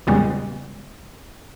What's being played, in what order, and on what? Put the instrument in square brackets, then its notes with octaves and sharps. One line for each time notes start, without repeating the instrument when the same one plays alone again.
[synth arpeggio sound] E2 A#2 C#3 G3 G#3 B3